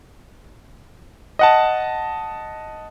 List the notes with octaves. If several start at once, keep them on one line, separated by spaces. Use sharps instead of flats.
D#5 F#5 A5